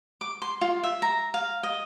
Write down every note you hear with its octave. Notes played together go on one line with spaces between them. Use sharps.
D6
C6
F4
E5
A#5
F5
D#5